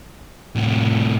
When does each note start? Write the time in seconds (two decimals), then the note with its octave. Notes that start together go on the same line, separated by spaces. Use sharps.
0.56 A2 C3